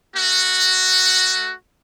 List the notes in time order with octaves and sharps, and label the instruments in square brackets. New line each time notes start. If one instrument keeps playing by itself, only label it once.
[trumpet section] A3 F#4